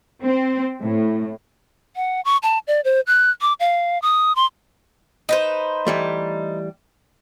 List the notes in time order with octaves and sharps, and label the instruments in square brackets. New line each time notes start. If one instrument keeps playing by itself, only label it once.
[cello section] C4
A2
[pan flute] F#5
C#6
A5
D5
C5
F#6
D6
F5
D#6
C6
[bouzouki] D#4 B4 C5
[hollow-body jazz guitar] E3 G3 A3